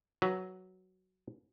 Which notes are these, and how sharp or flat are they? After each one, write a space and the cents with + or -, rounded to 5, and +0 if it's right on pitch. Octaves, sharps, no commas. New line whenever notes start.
F#3 +5 B4 +5